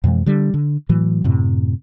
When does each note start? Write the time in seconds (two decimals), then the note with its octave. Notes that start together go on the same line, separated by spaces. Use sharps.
0.04 F2 B2 E3 G#3
0.26 D3 G3
0.54 D3
0.89 A2 E3 F#3
1.24 F#2 A2 C3